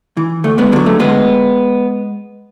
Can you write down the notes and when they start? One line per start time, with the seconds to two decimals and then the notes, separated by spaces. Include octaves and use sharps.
0.17 E3
0.44 D2 A3
0.58 G#3 B3
0.72 D3 G#3
0.76 F#3
0.86 A3
0.99 D2 G#3 B3